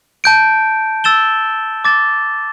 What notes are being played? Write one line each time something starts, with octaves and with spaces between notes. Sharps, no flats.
A5 G6 D7
E6 A6 E7 G7
D6 A6 E7 G7